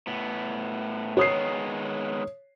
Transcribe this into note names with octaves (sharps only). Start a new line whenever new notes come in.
A2 B3
D#3 G#3 B3 C#5 D#6 C7